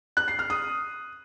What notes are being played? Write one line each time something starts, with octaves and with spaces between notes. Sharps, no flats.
F#6
C7
F6
D#6